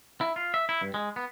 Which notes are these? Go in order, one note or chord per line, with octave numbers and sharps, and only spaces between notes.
E4
F4
E5
E4
G2
G#3
B3